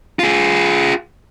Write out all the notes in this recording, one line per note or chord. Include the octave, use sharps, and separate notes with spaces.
F4 G#4